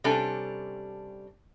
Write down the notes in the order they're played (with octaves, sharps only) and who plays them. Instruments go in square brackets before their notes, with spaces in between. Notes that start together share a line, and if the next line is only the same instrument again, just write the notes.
[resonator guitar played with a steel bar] C3 G3 C#4 D4 A4 G#5